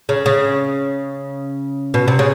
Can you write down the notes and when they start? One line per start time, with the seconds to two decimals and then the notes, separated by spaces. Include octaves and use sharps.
0.09 C#3
0.26 C#3
1.94 B2
2.08 C3
2.19 C#3